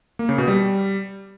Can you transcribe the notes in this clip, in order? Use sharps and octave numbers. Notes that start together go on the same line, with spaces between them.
A#3
C#3
B2
G3